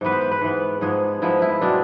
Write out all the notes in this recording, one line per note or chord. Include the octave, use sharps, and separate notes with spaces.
G#2 E3 B3 B4
C5
B4
B4
G#2 E3 B3
G#2 F3 G#3 B3 G#4
G#2 F3 G#3 B3 E4
E4
B2 G#3 C4 D4